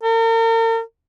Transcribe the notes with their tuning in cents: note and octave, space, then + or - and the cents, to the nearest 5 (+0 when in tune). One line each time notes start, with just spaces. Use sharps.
A#4 -40